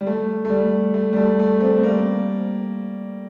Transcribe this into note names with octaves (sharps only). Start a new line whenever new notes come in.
G3
A3
A3
G3
A3
G3
A3
A3
A3 C4
C4
G3 A#3